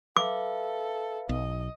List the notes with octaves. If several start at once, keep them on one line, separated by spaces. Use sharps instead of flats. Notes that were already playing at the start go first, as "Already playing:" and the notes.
A4 B4 E5 F5 D6
B1 D#5